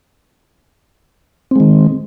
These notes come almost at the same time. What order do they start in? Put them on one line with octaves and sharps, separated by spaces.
C4 G#3 D#3